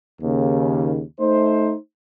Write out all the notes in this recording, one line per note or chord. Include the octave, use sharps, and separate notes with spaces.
D#2 C#3
A3 D#4 C5